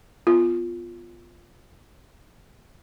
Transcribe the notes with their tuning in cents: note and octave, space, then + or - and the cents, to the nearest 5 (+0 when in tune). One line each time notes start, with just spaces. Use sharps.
B3 +0 F4 +0